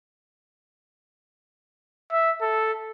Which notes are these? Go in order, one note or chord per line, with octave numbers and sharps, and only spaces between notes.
E5
A4